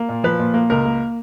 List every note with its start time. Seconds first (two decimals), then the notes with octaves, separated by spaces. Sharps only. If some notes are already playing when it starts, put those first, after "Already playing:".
Already playing: A#3
0.09 A#2
0.24 F3 B4
0.39 A#2
0.54 A#3
0.70 C#2 A#4
0.85 A#3